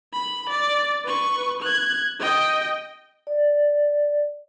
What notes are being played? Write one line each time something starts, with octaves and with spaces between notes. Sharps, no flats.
B5
D5
B4 C#6
F#6 G#6
D#5 G5
D5